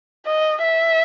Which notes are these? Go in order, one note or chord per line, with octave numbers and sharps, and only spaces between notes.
D#5
E5